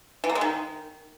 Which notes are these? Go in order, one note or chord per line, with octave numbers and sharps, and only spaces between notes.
E3
A#3
G#3
D#3